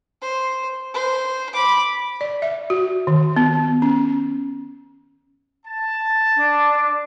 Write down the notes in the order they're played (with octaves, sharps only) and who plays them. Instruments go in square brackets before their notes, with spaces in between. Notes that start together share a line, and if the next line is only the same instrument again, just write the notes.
[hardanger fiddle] C5
C5
B5 D6
[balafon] D5
E5
F#4
D#3
B3
C#4
[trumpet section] A5
[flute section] D4